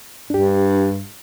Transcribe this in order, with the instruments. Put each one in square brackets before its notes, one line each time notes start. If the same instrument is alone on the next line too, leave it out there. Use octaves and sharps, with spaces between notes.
[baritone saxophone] G2 [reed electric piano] D4 G4